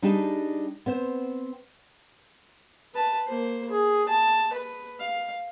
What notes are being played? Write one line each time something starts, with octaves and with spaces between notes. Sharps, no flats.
G3 D4 D#4 G4 G#4 A5
B3 C4 C5
B4 A5
A#3 C5
G#4
A5
B4
F5